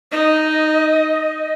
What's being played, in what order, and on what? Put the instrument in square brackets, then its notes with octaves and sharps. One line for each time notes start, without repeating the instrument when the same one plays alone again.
[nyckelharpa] D#4 [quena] D#5